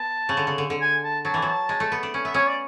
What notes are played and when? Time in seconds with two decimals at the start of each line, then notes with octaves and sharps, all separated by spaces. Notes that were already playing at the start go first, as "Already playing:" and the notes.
Already playing: B3 A5
0.29 C#3
0.37 D3
0.47 C#3
0.58 D3
0.70 D3
0.81 G#5
1.04 A5
1.25 F#3 A5
1.34 E3
1.42 F#3 A5
1.69 G#3
1.80 A3
1.92 B3
2.03 D4
2.14 C#4
2.25 B3 E5
2.34 C#4 C#5
2.47 D5